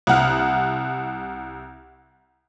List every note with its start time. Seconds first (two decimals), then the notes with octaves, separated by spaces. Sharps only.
0.07 C2 F#5 F6